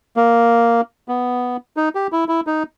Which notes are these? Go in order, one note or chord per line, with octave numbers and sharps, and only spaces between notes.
A#3
B3
D#4
G4
E4
E4
D#4